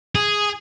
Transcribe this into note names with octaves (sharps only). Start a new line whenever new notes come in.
G#4